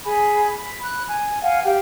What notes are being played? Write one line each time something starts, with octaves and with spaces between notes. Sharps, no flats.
G#4 G#5 B5
B5
B5 F#6
G#5
F5 F#5 G#5
G4 F5 G5